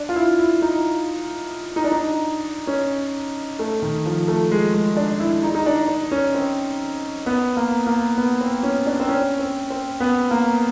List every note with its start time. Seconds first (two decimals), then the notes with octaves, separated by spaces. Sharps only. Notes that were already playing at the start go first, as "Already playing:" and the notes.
Already playing: D4
0.09 F4
0.16 E4
0.39 E4
0.62 D#4
1.76 D#4
1.84 D4
1.92 D#4
2.67 C#4
3.59 A3
3.82 D#3
4.06 F3
4.28 A3
4.51 G#3
4.74 G#3
4.97 D4
5.20 E4
5.43 D#4
5.55 D#4
5.66 D4
5.88 D4
6.12 C#4
6.35 C4
7.26 B3
7.57 A#3
7.87 A#3
8.18 B3
8.41 C4
8.63 C#4
8.86 D4
9.00 C4
9.09 C#4
9.39 C4
9.70 C4
10.00 B3
10.31 A#3